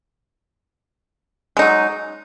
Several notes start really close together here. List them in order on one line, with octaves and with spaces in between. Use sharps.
G#3 D#4 F#3